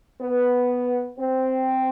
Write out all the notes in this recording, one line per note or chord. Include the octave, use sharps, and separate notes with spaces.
B3
C4